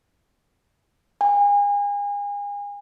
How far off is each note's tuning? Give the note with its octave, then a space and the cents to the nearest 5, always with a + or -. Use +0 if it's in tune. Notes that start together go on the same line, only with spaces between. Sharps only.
G#5 -35